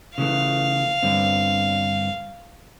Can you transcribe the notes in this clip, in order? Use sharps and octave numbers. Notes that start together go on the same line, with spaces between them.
C#3 E3 A3 F5
G2 D3 C4